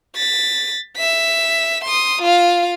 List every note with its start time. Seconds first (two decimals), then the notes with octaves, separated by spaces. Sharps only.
0.16 A6 B6
0.97 E5 B6
1.84 C6 D#6
2.22 F4 F5